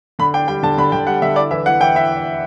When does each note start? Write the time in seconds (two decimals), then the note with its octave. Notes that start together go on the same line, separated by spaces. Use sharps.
0.19 D3 B5
0.34 D4 G5
0.48 G3 G5
0.63 D3 A5
0.78 D3 B5
0.92 D3 G5
1.07 G3 F#5
1.22 D3 E5
1.36 E4 D5
1.51 E3 E5
1.66 E3 F#5
1.81 E3 G5
1.95 E4 E5